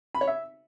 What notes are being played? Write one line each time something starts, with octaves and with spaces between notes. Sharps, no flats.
B5
C#5
E5